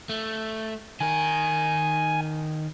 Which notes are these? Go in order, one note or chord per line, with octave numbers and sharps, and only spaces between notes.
A3
D#3 A#4 G#5